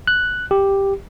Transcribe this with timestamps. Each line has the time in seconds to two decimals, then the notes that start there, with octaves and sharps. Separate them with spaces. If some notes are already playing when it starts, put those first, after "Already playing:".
0.07 F#6
0.51 G4